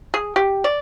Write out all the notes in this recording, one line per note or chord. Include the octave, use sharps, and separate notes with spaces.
G#4
G4
D5